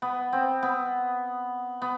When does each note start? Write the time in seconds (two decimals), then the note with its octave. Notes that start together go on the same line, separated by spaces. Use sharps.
0.02 B3
0.33 C4
0.63 B3
1.82 B3